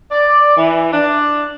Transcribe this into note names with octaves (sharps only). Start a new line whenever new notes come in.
D5
E3
D4